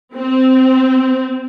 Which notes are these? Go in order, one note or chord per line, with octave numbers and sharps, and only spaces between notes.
C4